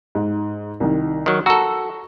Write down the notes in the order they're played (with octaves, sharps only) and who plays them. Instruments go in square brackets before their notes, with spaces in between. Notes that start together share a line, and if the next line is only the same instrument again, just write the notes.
[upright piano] G#2
C2 D#3
[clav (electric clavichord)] D#3 F#3
[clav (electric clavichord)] F#4 A4 [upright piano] A#5 E6